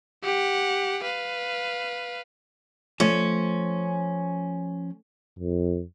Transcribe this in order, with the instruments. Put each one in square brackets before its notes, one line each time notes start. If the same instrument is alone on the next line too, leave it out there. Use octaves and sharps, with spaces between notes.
[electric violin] G4 F#5
B4 F5
[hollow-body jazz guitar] F3 [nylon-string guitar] A3 [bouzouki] C#4
[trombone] F2